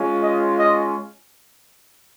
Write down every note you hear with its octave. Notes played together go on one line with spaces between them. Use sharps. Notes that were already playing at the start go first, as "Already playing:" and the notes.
Already playing: G#3 C#4 F4
D#5
D#5